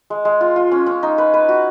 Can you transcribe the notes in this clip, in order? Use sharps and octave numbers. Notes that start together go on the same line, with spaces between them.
G#3
G#3
F4
F4
C#4
C#4
D#4
B4
B4
F#4